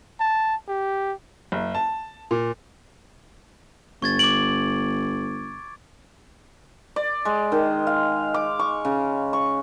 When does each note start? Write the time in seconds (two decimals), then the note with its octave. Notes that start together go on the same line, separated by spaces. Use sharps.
0.20 A5
0.68 G4
1.52 F#1
1.75 A5
2.31 A#2
4.02 G1 C#6 G#6 A6
4.19 D6 D7 F#7
6.96 D5
7.25 G#3
7.52 D#3
7.87 F5
8.34 D6
8.59 C#6
8.85 C#3
9.33 C#6